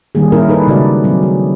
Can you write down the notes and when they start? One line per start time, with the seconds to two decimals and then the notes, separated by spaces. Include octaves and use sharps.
0.15 D#3 G3 A#3 G#4
0.32 C#4 E4 A#4
0.48 D#4 A4 B4
0.67 C#3 G#3 F#4 B4 D5
1.04 F#3 C4
1.23 G#4